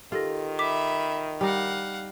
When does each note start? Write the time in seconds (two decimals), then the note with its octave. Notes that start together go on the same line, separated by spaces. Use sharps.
0.12 D#3 F4 G4 A4 A#6
0.59 E5 B5 D6 B6
1.41 G3 D#4 F5 F#5